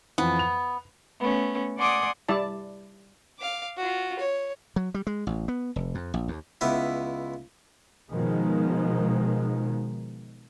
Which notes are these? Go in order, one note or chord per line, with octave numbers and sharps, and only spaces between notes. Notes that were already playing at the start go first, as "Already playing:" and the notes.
F2 E3 F3 B3
F7
A3 B3 C#4
D5 F#5 G#5 C6 D6 D#6
G3 E4 D5 A5
F5 D6
F4 F#4
C#5
F#3
G3
G#3
A1
B3
F1
F2
A#1
D#2
C#2 B3 E4
B2 D#3 F3 G#3